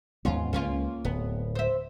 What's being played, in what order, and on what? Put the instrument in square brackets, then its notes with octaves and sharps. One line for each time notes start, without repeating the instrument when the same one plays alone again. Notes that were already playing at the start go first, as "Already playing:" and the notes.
[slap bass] D#2 G#2 B3 [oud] C#4 F4
[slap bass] C#2 [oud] A#3 C#4 F4
[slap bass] D1 [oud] B3
[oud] C5 E5